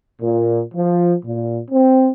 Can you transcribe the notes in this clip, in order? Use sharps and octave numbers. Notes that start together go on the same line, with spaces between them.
A#2
F3
A#2
C4